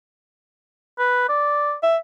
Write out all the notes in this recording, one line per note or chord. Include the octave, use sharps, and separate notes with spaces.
B4
D5
E5